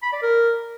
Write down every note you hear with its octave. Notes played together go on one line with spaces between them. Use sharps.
B5
D5
A#4